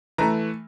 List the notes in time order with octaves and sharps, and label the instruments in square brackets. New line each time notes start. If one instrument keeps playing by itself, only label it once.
[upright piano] E3 A3 A#5